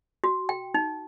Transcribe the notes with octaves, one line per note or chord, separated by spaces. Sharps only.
F#4
G5
D#4